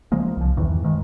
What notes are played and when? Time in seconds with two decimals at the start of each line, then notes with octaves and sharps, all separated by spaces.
0.12 C#3 F3 G#3 A#3
0.37 C2 F3
0.57 E2 G2 D#3 E3
0.84 D1 G2 D#3 G#3